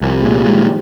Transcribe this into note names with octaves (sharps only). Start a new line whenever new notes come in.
C2 F3
A#2 G#3
G3
G#3
D#3
F3